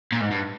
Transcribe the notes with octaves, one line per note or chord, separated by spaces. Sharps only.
A#2
G#2
G2